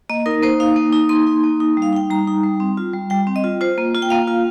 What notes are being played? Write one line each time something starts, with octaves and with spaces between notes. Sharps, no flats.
A#3 D#5
D#4 A#4
A#3 C5
D#4 F5
A#3
D#4
A#3 C6
D#4
A#3
D#4
G3
F5
D#4 G5
G3 A#5
D#4
G3
C4
F4
G3
G3 G5
C4
D#5
F4
F4 C5
A#3
F4
G5
A#3 F5
F4